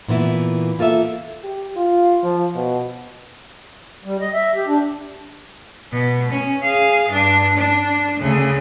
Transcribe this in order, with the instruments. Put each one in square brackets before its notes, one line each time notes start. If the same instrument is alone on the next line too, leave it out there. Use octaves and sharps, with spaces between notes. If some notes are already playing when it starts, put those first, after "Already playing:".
[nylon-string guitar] A#2 E3 B3 E4
A#3 F4 A4 B4 E5
[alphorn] G4
F4
F3
B2
[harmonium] G3
D#5
E5
G4
D4
[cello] B2
C#4
G#4 F5
G2 D4
D4
D2 C#3